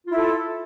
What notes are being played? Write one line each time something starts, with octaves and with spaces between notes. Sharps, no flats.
E4 F4 A4